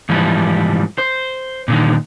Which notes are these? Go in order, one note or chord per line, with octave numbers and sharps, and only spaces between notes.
G#2 E3 F3 G3
C5
A#2 D3 D#3